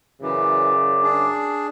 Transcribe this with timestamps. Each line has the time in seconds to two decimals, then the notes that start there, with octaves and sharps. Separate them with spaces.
0.22 F#2 C#3 E3 D5
1.03 D4 G#4